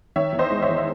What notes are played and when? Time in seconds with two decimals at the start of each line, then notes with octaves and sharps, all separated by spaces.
0.16 D#3 C#5 E5
0.33 E2
0.39 C5 D#5
0.50 G#3
0.62 C#5 E5
0.69 E2
0.78 E5